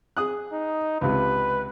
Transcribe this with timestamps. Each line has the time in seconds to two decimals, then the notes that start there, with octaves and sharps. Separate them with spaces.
0.17 G#4 D#6 F#6
0.52 D#4
1.01 C#2 C3 B4